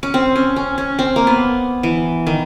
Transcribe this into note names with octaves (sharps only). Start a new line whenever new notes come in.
C#4
C4
C#4
C#4
C#4
C4
A#3
B3
E3
D#3